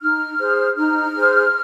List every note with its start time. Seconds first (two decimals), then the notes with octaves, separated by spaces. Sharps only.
0.01 D#4 F6
0.38 G#4 C5
0.75 D#4 F6
1.13 G#4 C5